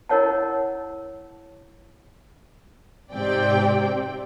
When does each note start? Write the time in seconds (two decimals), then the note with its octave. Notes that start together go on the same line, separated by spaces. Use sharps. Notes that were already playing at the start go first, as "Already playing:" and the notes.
0.09 E4 A#4 C#5 F#5 A5
3.13 G#2 C3 C4 G4 D5 G5